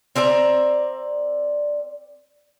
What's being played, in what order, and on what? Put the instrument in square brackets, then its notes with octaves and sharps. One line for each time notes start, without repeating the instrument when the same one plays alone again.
[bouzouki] C4 D5 E5 A#5